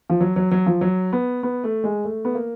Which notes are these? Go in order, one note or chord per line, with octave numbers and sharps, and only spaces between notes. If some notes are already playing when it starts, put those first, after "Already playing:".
F3
F#3
F#3
F#3
F3
F#3
B3
B3
A3
G#3
A3
B3
A#3